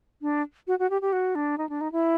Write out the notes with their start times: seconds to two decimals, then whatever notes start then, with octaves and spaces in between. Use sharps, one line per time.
0.22 D4
0.67 F#4
0.79 F#4
0.90 G4
1.01 G4
1.12 F#4
1.35 D4
1.58 D#4
1.69 D4
1.81 D#4
1.92 E4